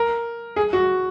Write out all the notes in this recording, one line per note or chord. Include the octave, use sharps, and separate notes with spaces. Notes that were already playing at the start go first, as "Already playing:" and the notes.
Already playing: A#4
G#4
F#4